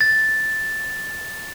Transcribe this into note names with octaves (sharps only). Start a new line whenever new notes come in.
A6